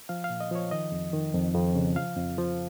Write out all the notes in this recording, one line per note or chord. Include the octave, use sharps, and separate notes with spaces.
F3 F5
F5
A#2
D#5
F3 C#5
D#3 D#5
F2
D#3
F2
F2
C#3
F3 F5
F2
F3